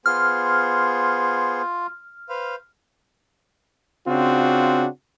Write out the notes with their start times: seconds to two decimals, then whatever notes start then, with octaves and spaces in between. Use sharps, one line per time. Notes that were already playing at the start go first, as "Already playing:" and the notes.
0.06 B3 F4 G#4 C5 F6
2.29 B4 C5 F5
4.06 C#3 C4 D4 F4 F#4